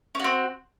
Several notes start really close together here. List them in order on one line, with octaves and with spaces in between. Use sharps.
C#4 F#4 C4